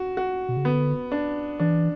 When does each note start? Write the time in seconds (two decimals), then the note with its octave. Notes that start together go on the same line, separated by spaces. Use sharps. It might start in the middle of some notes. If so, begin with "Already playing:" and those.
Already playing: F#4
0.17 F#4
0.48 B2
0.57 C#3
0.65 D3 B3
1.12 D4
1.60 E3 D4